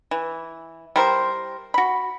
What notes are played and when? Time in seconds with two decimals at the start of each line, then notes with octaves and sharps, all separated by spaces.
0.11 E3
0.96 G3 E4 A#4 C5
1.74 F#4 B5